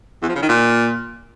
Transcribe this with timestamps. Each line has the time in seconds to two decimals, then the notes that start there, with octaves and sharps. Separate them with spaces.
0.22 E2
0.29 F3
0.36 C#3
0.42 D#3
0.49 A#2